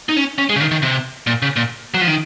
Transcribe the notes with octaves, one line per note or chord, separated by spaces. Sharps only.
D#4
C#4
C#4
G#3
C#3
D#3
D#3
C3
A#2
C#3
A#2
F#3
F3
D#3